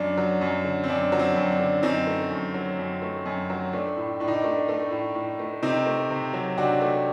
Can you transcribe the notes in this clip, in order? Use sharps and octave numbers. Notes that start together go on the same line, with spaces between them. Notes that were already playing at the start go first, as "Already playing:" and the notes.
Already playing: F#2 D4
F#3
F#2
D3
C4
F#2 D4
F#3
C4
F#2
D4
D3
F#2 C4 D#4
A3
F#2
F#3
F#2
A3
F#2
F#3
A3 D4
A2
A2 D4
D#4
D4
A3
A3
A2
A2
A3
C3 C4 D#4
A3
C3
F#3
C3 D4 F#4
A3